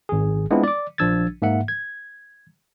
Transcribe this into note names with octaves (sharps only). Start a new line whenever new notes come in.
G#1 G#4
G#3 B3 C4 D4 E4 F4
D5 D6
A#1 F3 D4 E6 G#6 A6
G#2 A#3 E5 F#5
G#6